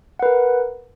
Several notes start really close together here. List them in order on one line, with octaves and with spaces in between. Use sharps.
F#5 B4 A#4